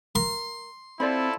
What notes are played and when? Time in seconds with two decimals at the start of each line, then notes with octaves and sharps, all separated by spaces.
0.15 A#4 C6
1.00 C4 E4 F4 A4 C5 D5 B5